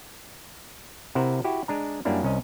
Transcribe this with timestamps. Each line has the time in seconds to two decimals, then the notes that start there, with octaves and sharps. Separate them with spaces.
1.15 C3 E4 A#4 C5 F#5
1.44 E4 F#4 G4
1.68 G#3 D4 A#5
2.05 F#2 G3 A#3 C#4 D4 E4
2.23 C2 C#4 D#5